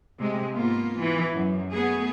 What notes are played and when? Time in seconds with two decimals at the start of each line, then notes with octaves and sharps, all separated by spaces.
0.19 C3 G#3
0.53 G#2 A#3 B3 F4
0.99 E3
1.33 F#2
1.71 A3 B3 G#4